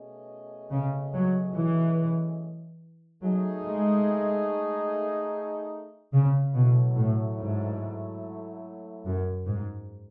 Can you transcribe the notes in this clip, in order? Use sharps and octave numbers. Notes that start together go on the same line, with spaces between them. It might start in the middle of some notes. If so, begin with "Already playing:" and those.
Already playing: B2 A3 C#4 G#4 D#5
C#3
F#3
E3
F#3 A3 D#4 G#4 D#5
G#3
C#3
B2 F#3 A3 E4
A2
G#2
F#2
G#2